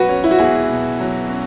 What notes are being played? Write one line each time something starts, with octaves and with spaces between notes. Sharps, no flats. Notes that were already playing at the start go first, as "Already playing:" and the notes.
Already playing: B2 F#3 F#4 B4
C#4
E4
F#4
E2 E4 G#4
B2
F#3
C#4